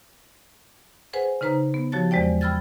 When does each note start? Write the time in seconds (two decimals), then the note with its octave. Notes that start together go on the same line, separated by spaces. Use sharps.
1.13 G#4 B4 C5 F#5 G#5
1.41 C#3 D#4 B4 C5 A#5
1.74 B3
1.92 F3 F#4 G4 C#5 A5 A6
2.11 E2 F#3 G#3 C5 D5 G5
2.41 G5 B5 E6 F6 G#6 A6